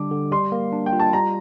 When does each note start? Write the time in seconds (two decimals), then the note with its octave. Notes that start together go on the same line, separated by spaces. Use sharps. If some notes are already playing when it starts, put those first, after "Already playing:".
Already playing: D3 G3 D4 G4 D6
0.11 D3
0.32 G3 C6
0.52 A#3
0.72 D4
0.86 G5
0.93 F4
1.00 A5
1.13 G3 A#5